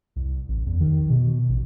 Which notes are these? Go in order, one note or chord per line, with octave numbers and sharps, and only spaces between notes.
C2
A1
E2
D#3
B2
A1